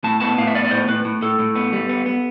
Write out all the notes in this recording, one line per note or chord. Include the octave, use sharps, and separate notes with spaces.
A2 A5
B3 A5
A2 F5
E5
B3 D5
D5
A2 C5
A2 B4
A2
A2 A4
A2
B3
G3
B3
B3